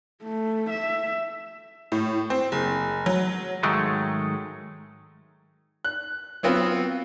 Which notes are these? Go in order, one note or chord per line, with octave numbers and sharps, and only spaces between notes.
A3
E5
A2
C4
F#1
F#3
G#2 D#3 F#3 G#3 A3
F#6
F#3 B3 C4 F4